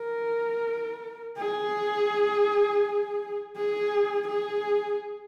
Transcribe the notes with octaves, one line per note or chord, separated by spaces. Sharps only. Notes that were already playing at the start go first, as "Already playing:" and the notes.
Already playing: A#4
G#4
G#4
G#4